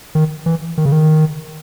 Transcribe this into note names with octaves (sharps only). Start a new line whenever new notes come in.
D#3
E3
D#3
C#3
D#3